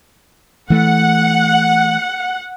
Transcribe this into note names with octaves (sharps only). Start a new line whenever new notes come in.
E3 A3 F#5